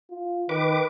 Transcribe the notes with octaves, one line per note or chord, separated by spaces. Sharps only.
F4
D#3 B4 D6